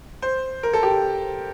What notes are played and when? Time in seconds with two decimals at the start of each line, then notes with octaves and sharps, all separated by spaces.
0.22 C5
0.63 A#4
0.73 A4
0.83 G4